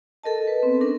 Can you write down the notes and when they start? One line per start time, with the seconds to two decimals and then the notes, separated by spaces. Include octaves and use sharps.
0.23 A4 A#4 D#5 A5
0.47 B4
0.63 B3 C4
0.80 C#4 D4 A4 A#4